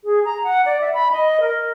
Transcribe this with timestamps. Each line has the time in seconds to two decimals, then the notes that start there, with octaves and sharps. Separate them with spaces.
0.04 G#4
0.25 A#5
0.44 F#5
0.66 D5
0.81 E5
0.94 B5
1.12 D#5
1.42 A#4